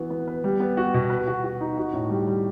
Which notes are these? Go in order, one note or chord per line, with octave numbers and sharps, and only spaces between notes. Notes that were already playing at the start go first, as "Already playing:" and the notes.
Already playing: E3 B3 F#4
B3
B4
G3
B3
F#4
B2
B4
F#4
F#4
D#4
F#4
A2
G3
G3